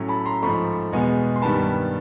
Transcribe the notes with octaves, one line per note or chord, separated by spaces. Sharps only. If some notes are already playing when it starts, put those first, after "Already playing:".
Already playing: A2 F#3 A3 C#4
A5 B5
A#5 C6
G#2 F3 A3 B5 C#6
E2 B2 G#3 B3
C6
G2 D#3 G3 B3 A5 B5